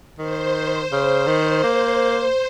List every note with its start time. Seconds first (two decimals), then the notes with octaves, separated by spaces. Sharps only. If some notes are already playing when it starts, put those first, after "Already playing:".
0.18 D#3 C5
0.92 C#3
1.27 D#3
1.64 A#3